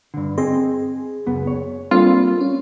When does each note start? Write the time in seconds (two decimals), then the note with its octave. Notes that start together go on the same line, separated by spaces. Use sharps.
0.14 G2 D3
0.38 C4 G#4 D#5 C6
1.26 C#2 F#2 B3
1.47 C#5
1.91 G3 A#3 C4 D4 F4 A4
2.41 C#4